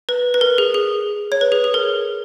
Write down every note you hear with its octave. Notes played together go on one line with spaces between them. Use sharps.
B4
B4
A#4
G#4
G#4
C#5
B4
G#4
G#4
A#4